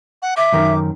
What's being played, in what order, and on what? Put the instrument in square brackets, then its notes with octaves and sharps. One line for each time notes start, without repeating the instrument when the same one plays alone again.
[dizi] F#5
[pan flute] E5 [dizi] D6
[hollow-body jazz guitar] F#2 D#3 A#4